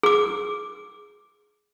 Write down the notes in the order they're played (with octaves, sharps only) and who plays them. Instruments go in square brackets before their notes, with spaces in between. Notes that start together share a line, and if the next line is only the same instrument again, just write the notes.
[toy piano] G#4 D6